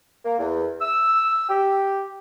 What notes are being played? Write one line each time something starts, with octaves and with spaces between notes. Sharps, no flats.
A#3
E2
E6
G4